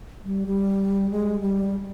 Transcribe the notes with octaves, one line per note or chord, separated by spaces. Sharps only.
G3
G3
G#3
G3